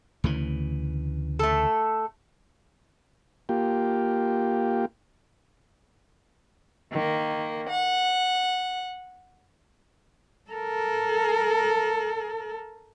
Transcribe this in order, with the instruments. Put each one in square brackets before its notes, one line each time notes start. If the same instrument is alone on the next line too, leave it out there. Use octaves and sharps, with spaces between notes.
[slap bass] D2 C#3 E3
[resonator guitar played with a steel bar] A3 A4
[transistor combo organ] A#3 F4 G4
[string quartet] D#3 A#3
F#5
[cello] A4 A#4